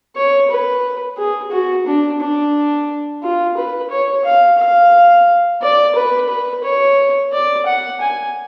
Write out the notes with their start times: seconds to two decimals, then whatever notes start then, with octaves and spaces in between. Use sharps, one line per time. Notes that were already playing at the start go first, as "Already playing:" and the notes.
0.16 C#5
0.50 B4
1.17 G#4
1.51 F#4
1.86 D4
2.20 D4
3.23 F4
3.57 B4
3.90 C#5
4.25 F5
4.59 F5
5.62 D5
5.95 B4
6.29 B4
6.64 C#5
7.32 D5
7.66 F#5
8.01 G#5